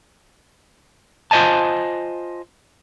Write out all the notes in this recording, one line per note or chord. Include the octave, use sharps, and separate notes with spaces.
F4 C5 D#5 G#5 A5